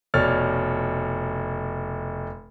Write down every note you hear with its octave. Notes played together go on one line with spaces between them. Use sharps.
F1 B2 C#5 D5 F6 A6